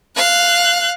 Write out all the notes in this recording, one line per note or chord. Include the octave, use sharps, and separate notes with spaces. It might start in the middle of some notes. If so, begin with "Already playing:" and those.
F5 F#6